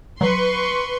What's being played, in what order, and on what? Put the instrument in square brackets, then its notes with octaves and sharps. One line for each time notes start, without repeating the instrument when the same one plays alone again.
[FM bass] F#3 [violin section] B4 C6 C#6